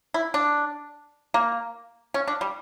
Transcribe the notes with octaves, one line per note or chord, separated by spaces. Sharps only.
E4
D4
A#3
C#4
D4
G3